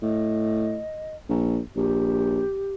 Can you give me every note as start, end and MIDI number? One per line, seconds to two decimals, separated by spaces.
0.02 0.81 45
0.02 1.16 75
1.29 1.59 34
1.76 2.42 34
1.76 2.75 67